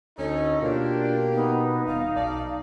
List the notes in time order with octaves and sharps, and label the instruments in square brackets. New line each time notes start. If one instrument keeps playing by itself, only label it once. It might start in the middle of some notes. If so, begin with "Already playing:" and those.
[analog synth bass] D2 [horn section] C#4 D#4 [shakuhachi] A4 [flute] D#5
[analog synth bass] B2 [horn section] A#3 G4 [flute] D4 [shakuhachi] F4
[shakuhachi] B3 [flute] D#4
[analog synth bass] D#1 [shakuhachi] F5
[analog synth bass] B1 [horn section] D5 A5